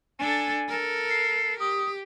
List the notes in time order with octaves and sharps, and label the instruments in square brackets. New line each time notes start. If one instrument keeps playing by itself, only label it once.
[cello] D4 A4 [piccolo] G#5
[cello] A4 A#4
[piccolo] C7
[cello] G4 [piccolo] D#6